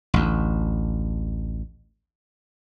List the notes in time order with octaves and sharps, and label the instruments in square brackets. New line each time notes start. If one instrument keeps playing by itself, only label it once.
[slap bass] A1 D2